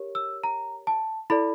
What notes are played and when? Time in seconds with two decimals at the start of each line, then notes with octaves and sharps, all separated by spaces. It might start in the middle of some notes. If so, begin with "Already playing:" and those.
Already playing: G4 A#4 C#5
0.15 E6
0.44 A#5
0.87 A5
1.30 E4 A4 D5 B5